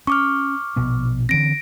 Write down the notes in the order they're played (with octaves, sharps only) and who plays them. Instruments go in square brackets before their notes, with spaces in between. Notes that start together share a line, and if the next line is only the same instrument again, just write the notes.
[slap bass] C#4 [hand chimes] C#6 D6 F6
[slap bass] A#1 B2 B3
[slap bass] D3 E3 C4 [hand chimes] A#6 D7